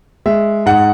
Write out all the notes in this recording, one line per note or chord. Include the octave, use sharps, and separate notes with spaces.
G#3 E5
G#2 F#5